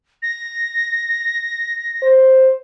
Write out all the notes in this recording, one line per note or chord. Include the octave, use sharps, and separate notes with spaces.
A#6
C5